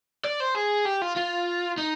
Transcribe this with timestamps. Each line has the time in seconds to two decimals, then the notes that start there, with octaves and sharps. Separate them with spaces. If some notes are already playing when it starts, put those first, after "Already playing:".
0.24 D5
0.40 C5
0.55 G#4
0.85 G4
1.02 F4
1.16 F4
1.78 D#4